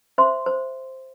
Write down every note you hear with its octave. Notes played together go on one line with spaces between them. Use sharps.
C5 E5 C6
C5